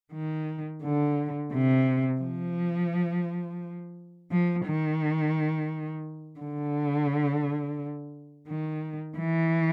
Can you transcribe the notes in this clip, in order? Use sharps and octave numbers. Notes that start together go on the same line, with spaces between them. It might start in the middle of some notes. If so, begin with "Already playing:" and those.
D#3
D3
C3
F3
F3
D#3
D3
D#3
E3